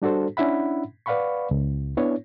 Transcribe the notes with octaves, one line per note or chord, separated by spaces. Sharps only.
G3 D4 F#4 A4 C5
C#4 D4 E4 E5 F#5 B5
B4 D5 F5 F#5 B5 C#6
C#2
B3 D4 E4 C#5